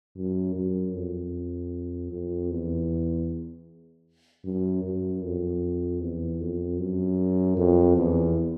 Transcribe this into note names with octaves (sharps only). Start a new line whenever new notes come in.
F#2
F#2
F2
F2
E2
F#2
F#2
F2
E2
F2
F#2
F2
E2